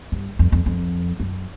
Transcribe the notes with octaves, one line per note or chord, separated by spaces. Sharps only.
G2
F2
F2
F2
F#2